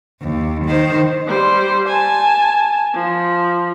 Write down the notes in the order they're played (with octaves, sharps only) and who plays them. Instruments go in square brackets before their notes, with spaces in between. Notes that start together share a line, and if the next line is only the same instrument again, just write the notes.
[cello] D#2
D#3 C5
[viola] G3 C5
G#5 A5
F3